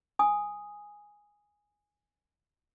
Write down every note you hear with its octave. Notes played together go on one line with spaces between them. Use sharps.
G#5 D#6